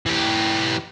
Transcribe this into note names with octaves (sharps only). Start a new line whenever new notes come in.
E3 G4